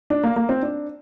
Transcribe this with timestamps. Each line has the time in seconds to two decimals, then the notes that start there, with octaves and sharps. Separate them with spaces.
0.10 D4
0.24 A#3
0.36 A#3
0.49 C4
0.62 D4